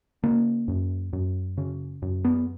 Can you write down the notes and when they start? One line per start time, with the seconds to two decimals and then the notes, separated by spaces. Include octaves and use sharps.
0.23 C#3 A#3
0.68 F#2
1.13 F#2
1.57 C#3
2.02 F#2
2.25 B3